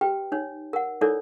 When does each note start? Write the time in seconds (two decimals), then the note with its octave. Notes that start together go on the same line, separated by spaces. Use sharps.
0.01 G4 B4 G5
0.32 D#4 C#5
0.73 A#4 F#5
1.01 D#4 E4 A4 A#4 C#5 D5